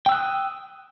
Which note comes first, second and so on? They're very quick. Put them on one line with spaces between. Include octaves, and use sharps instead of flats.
G5 E6 F#6 D#6